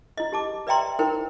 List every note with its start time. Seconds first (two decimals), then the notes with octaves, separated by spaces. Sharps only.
0.17 E4 D#5
0.32 G4 A5 D6
0.67 B4 D5 E5 G5 A#5 C6
0.99 D#4 E4 A#4 C5 G5